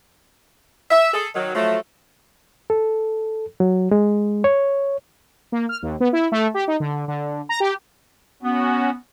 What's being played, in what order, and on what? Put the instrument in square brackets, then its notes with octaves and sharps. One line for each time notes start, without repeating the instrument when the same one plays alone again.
[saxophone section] E5
G#4 A4
D#3 F#3
F3 F#3 A3
[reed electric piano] A4
F#3
G#3
C#5
[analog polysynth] A#3
F6
D#2
B3
E4
A3
G4
D#4
D3
D3
A#5
G4
[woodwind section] B3 [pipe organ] C#4 F#4